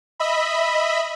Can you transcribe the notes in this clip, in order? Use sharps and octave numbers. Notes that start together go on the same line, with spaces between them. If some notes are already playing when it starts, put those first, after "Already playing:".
D#5 E5 B5